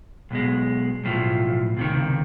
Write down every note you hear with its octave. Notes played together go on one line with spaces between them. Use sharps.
B1 B2 G#3
B1 A2 F3
C#2 C3 D#3